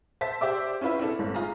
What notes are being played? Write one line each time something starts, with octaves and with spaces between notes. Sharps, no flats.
C5 E5 A5 B6
G4 C5 D5 E5 D6 E6
C#4 E4 F4 B4 E5
C4 D4 E4 A4
G1 G#2
F4 G#4 A#5